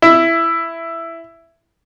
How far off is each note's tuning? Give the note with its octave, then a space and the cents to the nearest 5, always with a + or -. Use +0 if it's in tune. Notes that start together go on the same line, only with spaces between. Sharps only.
E4 +10